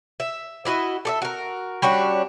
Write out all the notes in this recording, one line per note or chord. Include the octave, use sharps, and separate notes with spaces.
E5
D4 E4 F#4 D#5
A4 D5 E5
F#4 A#4
G3 C#4 D4 F#4